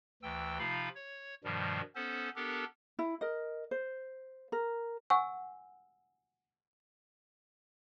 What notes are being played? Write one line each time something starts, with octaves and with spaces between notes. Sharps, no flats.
D2 E3 G5 E6
C3 F3 D#4 F4 F5 B5
C#5
G2 B2 D#3 F3 G3
B3 C#4 A4 C5
B3 D4 G4 A4 A#4
E4
A#4 D#5
C5
A#4
F#5 G#5 C#6 E6